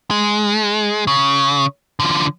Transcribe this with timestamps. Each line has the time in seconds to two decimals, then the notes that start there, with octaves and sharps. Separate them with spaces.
0.11 G#3
1.07 C#3
2.00 D3 F3